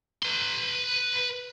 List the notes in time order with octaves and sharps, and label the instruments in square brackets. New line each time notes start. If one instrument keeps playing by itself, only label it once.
[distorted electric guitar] B4 C6